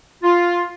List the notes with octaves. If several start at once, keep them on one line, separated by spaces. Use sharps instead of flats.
F4